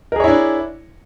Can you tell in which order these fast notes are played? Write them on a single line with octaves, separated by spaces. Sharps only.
A#4 G#4 C#5 E4 D4